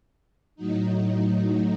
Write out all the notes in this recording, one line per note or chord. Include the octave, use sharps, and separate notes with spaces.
A2 F#3 D#4